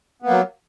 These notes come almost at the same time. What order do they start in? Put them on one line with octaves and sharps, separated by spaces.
B3 A#3 F#3